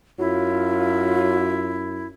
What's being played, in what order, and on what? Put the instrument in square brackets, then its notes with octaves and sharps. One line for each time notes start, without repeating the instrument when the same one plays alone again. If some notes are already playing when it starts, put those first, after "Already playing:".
[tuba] F#2 [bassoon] F#3 [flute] E4 [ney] F4